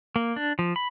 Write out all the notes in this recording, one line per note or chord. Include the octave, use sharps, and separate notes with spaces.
A#3
D4
F3
B5